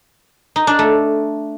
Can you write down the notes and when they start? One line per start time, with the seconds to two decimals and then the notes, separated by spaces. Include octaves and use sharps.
0.56 D#4
0.67 D4
0.79 A3